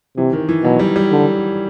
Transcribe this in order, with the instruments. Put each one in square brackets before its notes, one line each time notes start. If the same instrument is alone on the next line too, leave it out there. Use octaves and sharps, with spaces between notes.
[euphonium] C3 [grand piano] E3
[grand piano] D#3
E3
[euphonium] B2 [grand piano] F#3
[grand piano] G3
G3
[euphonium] D3